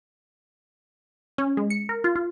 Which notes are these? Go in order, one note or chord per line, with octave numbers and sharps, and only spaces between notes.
C#4
G#3
C#7
A#4
F4
F4